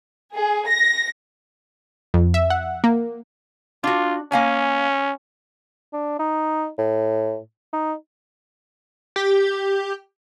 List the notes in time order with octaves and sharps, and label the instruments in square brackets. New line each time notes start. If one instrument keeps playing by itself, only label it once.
[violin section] G#4
A#6
[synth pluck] F2
E5
F#5
A#3
[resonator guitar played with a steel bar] D4 F#4 [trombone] F4
[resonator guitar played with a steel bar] A#3 F5 G#5 [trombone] C#4
[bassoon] D4
D#4
A2
D#4
[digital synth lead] G4